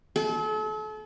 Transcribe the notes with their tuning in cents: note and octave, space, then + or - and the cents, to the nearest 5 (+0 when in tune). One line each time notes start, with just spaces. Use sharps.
A4 -40